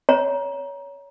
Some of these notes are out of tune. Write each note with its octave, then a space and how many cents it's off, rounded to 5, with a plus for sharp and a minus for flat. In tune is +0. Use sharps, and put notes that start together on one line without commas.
C#5 +20 A#5 +20